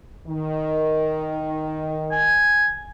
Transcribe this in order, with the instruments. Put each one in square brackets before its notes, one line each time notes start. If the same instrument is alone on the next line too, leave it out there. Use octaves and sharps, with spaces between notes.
[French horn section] D#3
[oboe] G#5